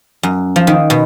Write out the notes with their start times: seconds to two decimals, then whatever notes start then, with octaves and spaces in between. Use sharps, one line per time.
0.23 F#2
0.56 F3
0.67 D#3
0.90 B2